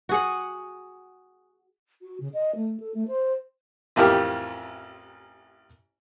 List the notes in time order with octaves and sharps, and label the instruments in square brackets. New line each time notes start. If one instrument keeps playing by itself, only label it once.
[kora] F#4 G#4 F#5
[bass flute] F#4
C#3
D#5
A3
A4
A3
C5
[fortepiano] A1 F2 E4 G4 A#4 F6